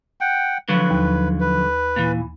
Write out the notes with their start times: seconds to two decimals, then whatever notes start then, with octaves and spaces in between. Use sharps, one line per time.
0.21 F#5 G5
0.69 D3 F3 F#3 B4
0.90 D#2
1.40 B4
1.96 A#2 E3